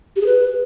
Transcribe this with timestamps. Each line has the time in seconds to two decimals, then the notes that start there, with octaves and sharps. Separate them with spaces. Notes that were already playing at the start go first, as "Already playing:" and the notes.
0.16 G4
0.21 G#4
0.26 B4